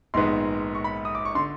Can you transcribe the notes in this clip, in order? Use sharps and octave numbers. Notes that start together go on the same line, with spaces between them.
A#1 G#2 D#3 G#3 B3 C6
C#6
B5
D#6
D6
C#6
D3 C6